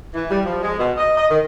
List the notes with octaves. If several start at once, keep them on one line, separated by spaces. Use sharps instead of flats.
E3
G3
F3
G#3
B2
D#5
D#5
D#3